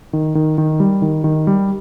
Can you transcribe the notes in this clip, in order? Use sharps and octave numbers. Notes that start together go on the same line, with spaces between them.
D#3
D#3
D#3
G3
D#3
D#3
G3